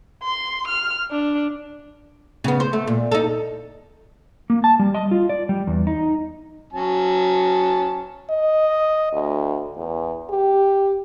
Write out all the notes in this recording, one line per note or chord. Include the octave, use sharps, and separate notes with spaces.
C6
F6
D4
C#3 B3
C5
A3
A#2
D#4 A4
A#3
A5
G3
D#5
F4
D5
G3
E2
D#4
F#3 C#4 A5
D#5
D2
E2
G4